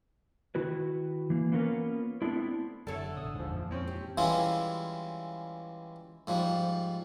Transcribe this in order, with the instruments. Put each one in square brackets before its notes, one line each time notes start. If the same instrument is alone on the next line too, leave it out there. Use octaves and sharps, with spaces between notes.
[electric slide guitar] D#3 E4 F#4 B4
E3 A#3
A#3 B3 C#4 F4 A#4 B4
A3 B3 C4 D4 E4
[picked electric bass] F#1 F#3 [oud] D3 C#5 E5 [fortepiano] A4
[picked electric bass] A1 B2 [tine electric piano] D#6
[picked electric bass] D#1 G#1 [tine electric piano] G#2 F3
[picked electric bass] F2 A#2 E3
[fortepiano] C4 C#4
[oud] G4
[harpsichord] E3 G3 G#3 C#4 E4 F4
G#2 F3 G3